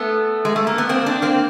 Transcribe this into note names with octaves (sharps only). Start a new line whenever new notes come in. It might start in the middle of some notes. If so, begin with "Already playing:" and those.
Already playing: A3 B3
G#3
A3
A#3
B3
A#3 C4
C4 D4
A#3 C4